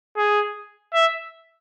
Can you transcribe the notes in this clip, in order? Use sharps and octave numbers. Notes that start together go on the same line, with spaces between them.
G#4
E5